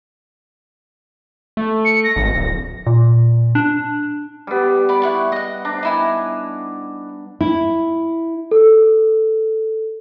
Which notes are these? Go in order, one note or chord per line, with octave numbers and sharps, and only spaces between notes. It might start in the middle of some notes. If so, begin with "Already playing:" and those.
A3
C#7
A#6
G#1
D1
A#2
D4
G3 B3
D5 B5 D6
E4 F#5 C#6
D#5 F#5
D4 A#5
D#4 E4 G#5
E4
A4